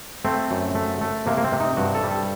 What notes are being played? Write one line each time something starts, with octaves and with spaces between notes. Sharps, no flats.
A3 C4
F#2
A3
A3
C3 A#3
A#3
C4
C3
D#4
G2 F#4
A4
G3
A4